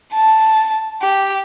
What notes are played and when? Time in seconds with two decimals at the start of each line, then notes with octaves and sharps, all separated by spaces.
0.14 A5
1.02 G4